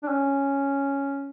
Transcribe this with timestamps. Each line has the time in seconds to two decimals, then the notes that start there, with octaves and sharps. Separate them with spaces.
0.03 D4
0.09 C#4